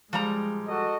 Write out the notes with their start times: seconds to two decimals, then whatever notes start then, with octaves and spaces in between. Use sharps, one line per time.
0.13 F3 G3 G#3 A#5
0.68 F#4 A4 D#5